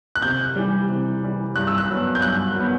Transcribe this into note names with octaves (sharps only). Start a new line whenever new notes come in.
F#6
C3 G6
E3 G3
C3
E3 G3
G2 F#6
E6
F#6
F#3 B3
G6
G2 F#6
F#3 B3